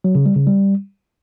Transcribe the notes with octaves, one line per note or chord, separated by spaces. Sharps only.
F#3
C#3
G3
C#3
G3